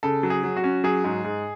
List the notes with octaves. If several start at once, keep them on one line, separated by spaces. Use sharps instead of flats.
C#3 A4
F#3
G#4
F#3
F#4
C#4
F#3 G#4
G#2
G#2